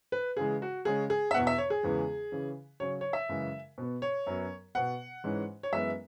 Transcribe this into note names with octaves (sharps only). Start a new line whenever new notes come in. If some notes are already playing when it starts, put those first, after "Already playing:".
B4
C#3 E3 G#3 G#4
F#4
C#3 G#3 C#4 G#4
G#4
E5
E2 B2 B3 F#5
E5
C#5
G#4
E2 C#3 E3 G#3 B3
C#3 E3 C#4
C#3 F#3 C#4 C#5
C#5
E5
F#2 C#3 E3 G#3
B2 B3
C#5
F#2 F#3 B3
B2 B3 F#5
G#2 E3 G#3 C#4
C#5
F#2 E3 G#3 B3 E5